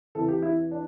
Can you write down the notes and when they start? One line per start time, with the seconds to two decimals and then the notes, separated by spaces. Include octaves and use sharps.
0.15 E2 C3 E3 A4
0.28 G4
0.42 E4
0.71 D4